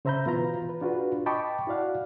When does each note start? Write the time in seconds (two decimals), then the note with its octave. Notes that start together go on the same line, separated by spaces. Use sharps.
0.05 C#3 C5 E5 A#5 B5 G6
0.26 B2 E3 E4 F4 B4 A#5
0.69 B4
0.81 D4 F4 F#4 G#4 B4
1.26 D#5 G5 A5 B5 C#6 D6
1.67 E4 F#4 D5 F5 F#5